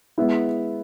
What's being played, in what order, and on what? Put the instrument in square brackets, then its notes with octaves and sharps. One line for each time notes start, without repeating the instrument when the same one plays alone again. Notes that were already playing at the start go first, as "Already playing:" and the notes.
[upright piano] G#3 B3 E4